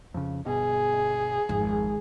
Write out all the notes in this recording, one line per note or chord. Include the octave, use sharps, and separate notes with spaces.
F2 C#3
G1 B2 G#4
G#1 F2